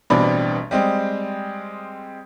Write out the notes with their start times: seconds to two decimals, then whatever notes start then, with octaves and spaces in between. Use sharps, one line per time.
0.10 A1 B2 G3 C4 D4 B5
0.71 G3 G#3 C4